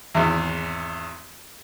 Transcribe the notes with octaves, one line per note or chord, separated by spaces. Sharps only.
G#1 E2